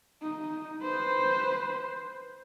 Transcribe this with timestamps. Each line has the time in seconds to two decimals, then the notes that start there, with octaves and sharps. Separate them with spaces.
0.22 D#4
0.83 B4 C5